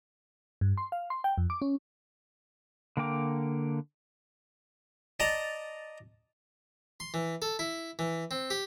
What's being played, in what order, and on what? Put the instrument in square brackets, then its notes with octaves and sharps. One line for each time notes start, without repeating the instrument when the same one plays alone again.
[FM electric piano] G2
C6
F5
C6
G5
F2
D6
C#4
[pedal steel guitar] D3 A#3 A#4 G5 D6
[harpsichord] D5 D#5 A5 A#5
C6
E3
A4
E4
E3
C4
G4